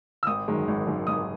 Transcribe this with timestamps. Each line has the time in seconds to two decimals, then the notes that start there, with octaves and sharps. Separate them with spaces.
0.23 E6
0.27 G#1 D#6
0.48 F#2 D#3 G#3
0.68 G#1
0.87 F#2 D#3 G#3
1.07 G#1 D#6